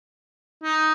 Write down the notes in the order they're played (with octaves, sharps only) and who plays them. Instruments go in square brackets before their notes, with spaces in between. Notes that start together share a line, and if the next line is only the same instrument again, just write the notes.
[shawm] D#4